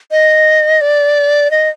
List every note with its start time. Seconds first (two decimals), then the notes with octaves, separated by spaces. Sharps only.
0.11 D#5
0.81 D5
1.51 D#5